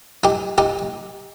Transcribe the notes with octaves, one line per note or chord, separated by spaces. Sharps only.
D#4 G4
D#4 G4